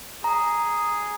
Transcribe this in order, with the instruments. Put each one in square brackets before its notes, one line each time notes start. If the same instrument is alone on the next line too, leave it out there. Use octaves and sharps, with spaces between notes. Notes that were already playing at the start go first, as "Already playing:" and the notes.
[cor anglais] G#4 [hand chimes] A#5